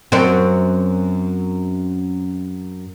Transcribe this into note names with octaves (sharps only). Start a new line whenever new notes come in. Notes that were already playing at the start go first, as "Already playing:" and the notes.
F#2 C4